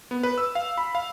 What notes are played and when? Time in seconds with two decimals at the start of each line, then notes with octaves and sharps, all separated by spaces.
0.11 B3
0.23 B4
0.38 E6
0.55 F5
0.78 B5
0.95 F5